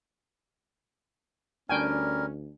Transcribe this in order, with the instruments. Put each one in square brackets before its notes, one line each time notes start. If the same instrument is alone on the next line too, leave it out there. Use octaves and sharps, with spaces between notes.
[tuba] D2 [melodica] G3 A#4 [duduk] C#4 [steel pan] D4 G5 G#5